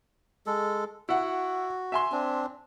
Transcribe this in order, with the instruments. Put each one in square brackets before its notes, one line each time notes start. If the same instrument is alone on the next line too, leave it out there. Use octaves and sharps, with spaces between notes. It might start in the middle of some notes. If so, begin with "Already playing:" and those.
[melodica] G#3 A4
[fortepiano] E4 F#5 [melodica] F#4
[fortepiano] E5 G#5 C6
[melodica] C4 D4